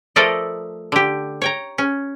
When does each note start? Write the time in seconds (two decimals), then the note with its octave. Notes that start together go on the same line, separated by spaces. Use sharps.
0.16 F3 A3 A4 A#4 D5 D#5
0.92 D3 G4
1.42 C#5 G5 A#5
1.78 C#4